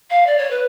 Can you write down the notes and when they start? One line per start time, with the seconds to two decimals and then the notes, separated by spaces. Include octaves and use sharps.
0.10 F5
0.27 D5
0.38 C#5
0.50 B4